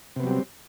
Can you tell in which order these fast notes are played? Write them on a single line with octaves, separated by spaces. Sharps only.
C3 B3 F#3 G3 C4